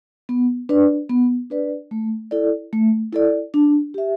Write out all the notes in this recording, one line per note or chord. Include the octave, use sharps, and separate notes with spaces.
B3
D4 B4 D5
B3
D4 B4 D5
A3
E4 A4 D5
A3
E4 A4 D5
D4
G4 E5